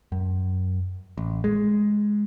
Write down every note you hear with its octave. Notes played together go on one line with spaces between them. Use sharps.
F#2
A1
G#3